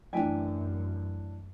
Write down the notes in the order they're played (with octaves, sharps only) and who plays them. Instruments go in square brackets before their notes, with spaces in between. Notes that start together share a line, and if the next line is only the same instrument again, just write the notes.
[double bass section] F#2 [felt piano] A2 E3 D4 [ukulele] E5 G5 G#5